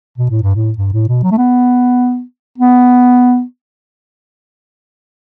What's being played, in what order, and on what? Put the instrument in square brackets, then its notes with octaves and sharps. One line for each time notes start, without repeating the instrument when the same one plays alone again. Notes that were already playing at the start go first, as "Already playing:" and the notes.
[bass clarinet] B2
A2
G2
A2
G2
A2
B2
F#3
A3
B3
B3